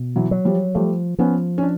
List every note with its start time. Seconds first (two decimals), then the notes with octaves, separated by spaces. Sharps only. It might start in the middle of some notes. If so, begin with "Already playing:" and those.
Already playing: B2
0.16 E3 F#3
0.31 F#3
0.45 F3 G3
0.75 F3 G3 A3
1.19 F3 B3 C#4
1.58 C#4
1.63 D4